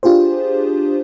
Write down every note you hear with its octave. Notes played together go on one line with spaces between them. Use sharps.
D4 F4 G4 G#4 C5